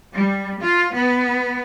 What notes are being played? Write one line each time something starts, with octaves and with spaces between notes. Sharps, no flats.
G3
F4
B3